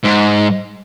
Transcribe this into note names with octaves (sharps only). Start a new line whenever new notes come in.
G#2